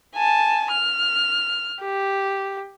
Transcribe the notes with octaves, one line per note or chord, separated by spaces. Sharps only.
G#5 A5
F6
G4